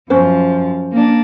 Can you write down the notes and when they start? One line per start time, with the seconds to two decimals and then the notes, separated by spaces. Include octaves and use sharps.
0.10 F#2 F3 C#4 C5
0.92 A#3 D4